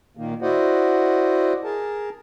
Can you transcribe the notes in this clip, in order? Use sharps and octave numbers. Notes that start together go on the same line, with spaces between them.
A#2 D#3 A#3
E4 F#4 C5 D5 D#5 F#5
G#4 A#4 A5